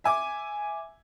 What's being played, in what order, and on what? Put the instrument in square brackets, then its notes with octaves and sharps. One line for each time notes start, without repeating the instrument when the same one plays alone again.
[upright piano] E5 G#5 D6